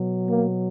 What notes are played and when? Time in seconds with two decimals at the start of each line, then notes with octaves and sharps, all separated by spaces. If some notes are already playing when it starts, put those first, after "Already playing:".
Already playing: B2 F#3
0.29 A#3